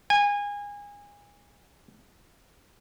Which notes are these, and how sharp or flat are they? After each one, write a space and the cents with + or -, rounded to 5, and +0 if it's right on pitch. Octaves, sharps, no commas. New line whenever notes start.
G#5 -25